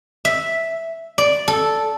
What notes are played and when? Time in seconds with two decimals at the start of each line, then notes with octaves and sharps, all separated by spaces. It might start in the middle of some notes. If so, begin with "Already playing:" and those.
0.25 E5
1.18 D5
1.48 A4